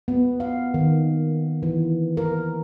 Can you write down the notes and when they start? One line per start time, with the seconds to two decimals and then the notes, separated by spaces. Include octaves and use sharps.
0.08 B3
0.40 F5
0.74 D#3
1.63 E3
2.17 A#4